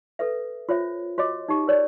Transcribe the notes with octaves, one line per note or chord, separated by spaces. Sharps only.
A4 B4 E5
F4 C5 C#5 E5
F#4 C#5 D#5 D6
D#4 G4
A#4 C#5 D5